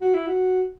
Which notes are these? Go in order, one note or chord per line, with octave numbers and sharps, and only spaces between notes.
F#4
E4
F#4